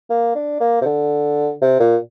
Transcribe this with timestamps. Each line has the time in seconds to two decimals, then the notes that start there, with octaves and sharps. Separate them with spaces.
0.10 A#3
0.35 D4
0.60 A#3
0.81 C3
0.85 D3
1.61 C3
1.80 A#2